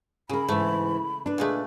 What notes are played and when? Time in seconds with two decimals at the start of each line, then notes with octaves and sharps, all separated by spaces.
0.29 C#3 G#4 A#4 B5
0.49 G#2 E3 A3
1.26 D4 B4
1.38 A#2 G#3 A3